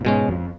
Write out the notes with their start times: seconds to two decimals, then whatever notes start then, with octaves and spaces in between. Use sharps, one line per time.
0.01 A#2
0.05 G#2 B2 G#3 C#4
0.28 F2